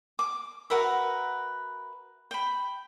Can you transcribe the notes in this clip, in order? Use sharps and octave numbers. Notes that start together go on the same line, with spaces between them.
D6
F#4 A#4 B4 E5
G5 B5